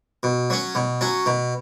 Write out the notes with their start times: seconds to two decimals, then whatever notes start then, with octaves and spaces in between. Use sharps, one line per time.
0.23 B2
0.50 F#3 C#4
0.75 B2
1.01 F#3 C#4
1.26 B2